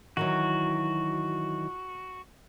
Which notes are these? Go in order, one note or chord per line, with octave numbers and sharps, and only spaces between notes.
D#3 E3 F#3 F#4